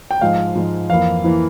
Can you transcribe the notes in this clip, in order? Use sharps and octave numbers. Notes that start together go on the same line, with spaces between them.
G5
G#2 F3 G#3 F5
G#2 F3 G#3
F2 E3 A#3 E4 F5
E3 A#3 E4